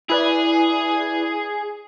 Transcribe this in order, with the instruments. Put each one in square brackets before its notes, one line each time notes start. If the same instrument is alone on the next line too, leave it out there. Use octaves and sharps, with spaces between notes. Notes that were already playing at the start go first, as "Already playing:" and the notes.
[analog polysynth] E4 B4 D5 [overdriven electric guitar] G#4